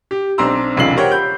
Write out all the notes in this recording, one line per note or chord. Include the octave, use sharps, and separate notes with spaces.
G4
B1 C4 D4 A#5 C6 E6
E1 B1 C#3 F4 C7 F#7
G4 A#4 C5 C#5 F#5 G5
B5 G6